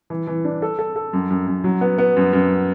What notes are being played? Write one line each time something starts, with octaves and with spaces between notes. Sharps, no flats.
E3
E3
D4
A4
A4
A4
F#2
F#2
F#2
F#3
B3
B3
F#2
F#2